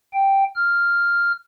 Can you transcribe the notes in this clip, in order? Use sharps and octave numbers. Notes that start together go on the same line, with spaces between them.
G5
F6